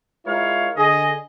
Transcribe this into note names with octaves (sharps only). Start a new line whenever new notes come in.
G#3 E4 F4 A#4 C#5 F5
D3 G#4 D#5